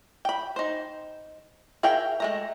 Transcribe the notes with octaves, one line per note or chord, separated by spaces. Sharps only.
G5 B5
D#4 C5
G#4 A#4 E5 F5 G5
G#3 A3 A#5